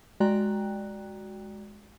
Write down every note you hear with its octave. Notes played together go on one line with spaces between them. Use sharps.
G#3 F#4 D5 G5 A#5 F#6